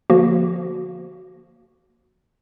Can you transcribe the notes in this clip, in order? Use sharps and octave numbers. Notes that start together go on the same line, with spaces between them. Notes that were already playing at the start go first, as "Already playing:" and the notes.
D3 F3 A#3 F#4